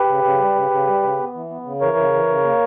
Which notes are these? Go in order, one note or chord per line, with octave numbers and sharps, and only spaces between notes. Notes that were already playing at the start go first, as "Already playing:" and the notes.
Already playing: G4 B4
C#3
C#3
G3
C#3
C#3
G3
C#3
B3
E3
B3
C#3
E3 A#4 C#5
C#3
E3
C#3
A#3